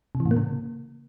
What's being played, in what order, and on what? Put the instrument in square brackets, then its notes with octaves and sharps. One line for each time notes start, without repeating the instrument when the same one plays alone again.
[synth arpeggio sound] C3
E3
A2
A#3
C#3